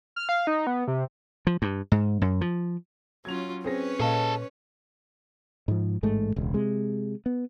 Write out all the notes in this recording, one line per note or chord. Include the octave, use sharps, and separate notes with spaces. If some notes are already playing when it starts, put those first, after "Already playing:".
F6
F5
D#4
B3
C3
F3
G2
G#2
F#2
F3
F#3 C#4 F4 G#6 F7
C4 C#4 G#4 B4 C#5 A#6
A#2 G#4 A4 D#5 F5 A5
G#2 F3
A1 G#2 G#3 A3
E1 C#2
C3 G#3
B3